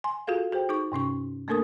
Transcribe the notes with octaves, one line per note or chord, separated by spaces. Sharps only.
G#5 C6
F4 F#4 G#4 A4 F5
F#4 G#4 C5 G5
D#4 G#4 C#6
G2 C3 C#4 C#6
A3 A#3 D4 A4 A#4 D#6